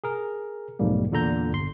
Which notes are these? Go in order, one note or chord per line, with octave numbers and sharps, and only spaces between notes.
G#4 A#4
B1 F2 G#2 G3 A#3
E2 A#2 D3 A4 A#5 G6
G1 C6